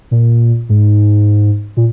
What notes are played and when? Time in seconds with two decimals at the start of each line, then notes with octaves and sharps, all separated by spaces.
0.11 A#2
0.69 G#2
1.77 A#2